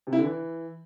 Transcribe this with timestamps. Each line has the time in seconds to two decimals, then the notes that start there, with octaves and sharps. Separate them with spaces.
0.07 C3
0.13 E4
0.18 D3
0.24 E3